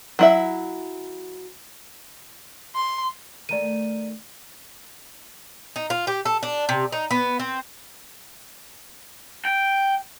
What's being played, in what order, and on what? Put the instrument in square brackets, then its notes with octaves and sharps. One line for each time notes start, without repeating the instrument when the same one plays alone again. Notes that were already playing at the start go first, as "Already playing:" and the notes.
[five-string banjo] F#3 E4 E5
[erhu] C6
[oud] D#3 A3 [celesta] D5 A#5 D#7
[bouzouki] D#4
F4
G4
A4
D4
C3
D#4
B3
C4
[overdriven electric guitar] G5